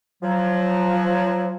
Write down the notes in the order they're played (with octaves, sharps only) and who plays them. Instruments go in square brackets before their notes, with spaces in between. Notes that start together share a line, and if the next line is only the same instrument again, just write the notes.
[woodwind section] F3 F#3